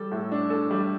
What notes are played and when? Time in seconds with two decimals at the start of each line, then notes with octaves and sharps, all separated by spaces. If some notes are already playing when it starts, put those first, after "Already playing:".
Already playing: G3 A4
0.12 A2
0.32 D4
0.50 A4
0.71 G3